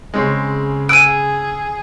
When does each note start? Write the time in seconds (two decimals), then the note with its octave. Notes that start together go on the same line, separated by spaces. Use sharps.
0.14 C#3 G#3 C4 C#4
0.89 G#4 D#6 E6 F#6 D7 D#7